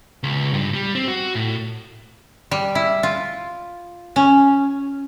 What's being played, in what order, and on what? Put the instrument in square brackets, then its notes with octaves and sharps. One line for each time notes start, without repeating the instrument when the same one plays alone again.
[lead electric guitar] C#2
G2
G3
C4
F#4
A2
[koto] G3
E4
F4
C#4